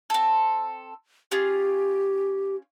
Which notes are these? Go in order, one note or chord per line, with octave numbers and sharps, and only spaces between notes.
C4 A4
C#4 F4 G4 G#4